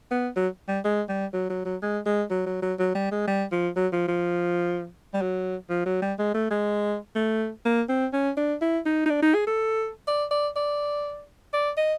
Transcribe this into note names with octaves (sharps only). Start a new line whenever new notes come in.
B3
F#3
G3
G#3
G3
F#3
F#3
F#3
G#3
G#3
F#3
F#3
F#3
F#3
G3
G#3
G3
F3
F#3
F3
F3
G3
F#3
F3
F#3
G3
G#3
A3
G#3
A3
A#3
C4
C#4
D4
E4
D#4
D#4
D4
D#4
G#4
A4
D5
D5
D5
D5
D#5